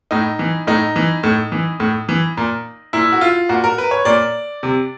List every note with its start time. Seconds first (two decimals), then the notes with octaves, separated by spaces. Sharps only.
0.11 A2 D#4
0.39 E3
0.67 A2 D#4
0.96 E3
1.23 A2
1.52 E3
1.80 A2
2.09 E3
2.37 A#2
2.93 A#2 E4
3.12 F#4
3.21 F4
3.49 A#2 F#4
3.64 A#4
3.78 B4
3.91 C#5
4.05 A#2 D5
4.63 C3